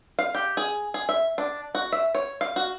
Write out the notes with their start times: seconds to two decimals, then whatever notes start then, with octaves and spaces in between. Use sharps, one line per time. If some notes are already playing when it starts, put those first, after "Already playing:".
0.19 F5
0.35 G4
0.57 G#4
0.94 G#4
1.09 E5
1.38 D4
1.75 F#4
1.92 E5
2.15 C#5
2.41 F5
2.56 F#4